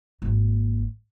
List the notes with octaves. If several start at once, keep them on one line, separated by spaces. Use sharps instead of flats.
G#1 A#3